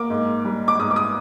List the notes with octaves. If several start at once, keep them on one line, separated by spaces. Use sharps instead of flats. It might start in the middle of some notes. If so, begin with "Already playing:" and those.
Already playing: A#3 D6
G#2
G3
D6
G#2 D#6
D6
D#6